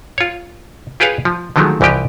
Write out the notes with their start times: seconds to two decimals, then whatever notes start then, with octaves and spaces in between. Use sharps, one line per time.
0.18 F4 C#5
1.00 F4 G4 G#4 B4 C#5 F5
1.25 F3
1.56 D3 D#3 F3 F#3 G#3 A3
1.81 C2 E3 F3 G4 D#5